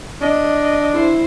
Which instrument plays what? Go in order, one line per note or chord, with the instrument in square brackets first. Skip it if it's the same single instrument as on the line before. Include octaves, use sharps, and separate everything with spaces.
[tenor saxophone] D4 [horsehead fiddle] D#5
[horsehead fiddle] E4 C5